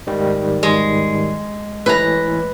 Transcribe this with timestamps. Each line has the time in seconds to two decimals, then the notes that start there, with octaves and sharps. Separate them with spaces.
0.07 G#2 D#3 G3
0.63 G#3
1.86 A2 E3 B4 A#5